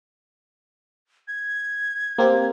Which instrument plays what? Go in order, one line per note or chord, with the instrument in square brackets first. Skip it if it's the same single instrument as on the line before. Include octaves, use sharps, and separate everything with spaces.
[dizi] G#6
[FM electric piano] A#3 C4 G4